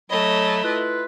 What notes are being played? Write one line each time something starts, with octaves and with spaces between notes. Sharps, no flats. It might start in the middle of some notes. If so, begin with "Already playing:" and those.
F#3 A3 C#5 D#5 B5
E4 F4 B4